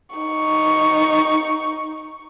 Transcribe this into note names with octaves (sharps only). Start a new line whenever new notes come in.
D#4 C#6